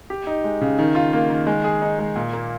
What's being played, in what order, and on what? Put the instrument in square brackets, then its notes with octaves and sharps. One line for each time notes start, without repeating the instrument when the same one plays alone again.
[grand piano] G4
D#4
G#3
C#3
D#3
F4
A#3
D#3
G#3
G#4
D#4
G#3
A#2
A#3